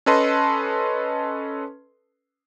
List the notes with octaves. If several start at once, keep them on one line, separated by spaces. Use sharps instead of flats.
C#4 A4 B4 D#5 A5 C6